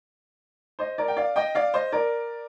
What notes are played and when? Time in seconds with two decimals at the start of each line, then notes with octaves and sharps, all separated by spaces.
0.79 C5 D#5
0.98 A#4 D5
1.08 G5
1.17 D5 F5
1.36 D#5 G5
1.55 D5 F5
1.74 C5 D#5
1.92 A#4 D5